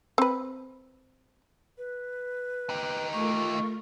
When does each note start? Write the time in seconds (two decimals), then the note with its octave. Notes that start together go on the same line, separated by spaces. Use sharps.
0.18 C4 B4
1.78 B4
2.70 D#4 G4
3.13 A3 F4 A#4 C#6